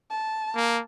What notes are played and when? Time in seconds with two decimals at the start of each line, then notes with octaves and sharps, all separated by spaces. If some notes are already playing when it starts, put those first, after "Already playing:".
0.10 A5
0.55 A#3